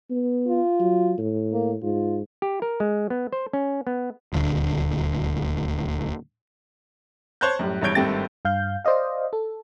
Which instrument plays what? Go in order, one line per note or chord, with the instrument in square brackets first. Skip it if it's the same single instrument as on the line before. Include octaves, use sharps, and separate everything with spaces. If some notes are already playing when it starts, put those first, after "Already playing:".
[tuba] B3
[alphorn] F4
[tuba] F#3
A2
[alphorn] A#3
[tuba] G#2 [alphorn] F4
[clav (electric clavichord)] G4
A#4
G#3
B3
C5
C#4
B3
[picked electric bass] D#1 D2
[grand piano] C5 C#5 A5 F#6 G6
F#2 A2 G3
F1 E2 G2 C#5 G6 D7
G#1 G2 A3 C4 G4 A6
[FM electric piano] G2 F5 G6
C5 D5 D#5 F5
A4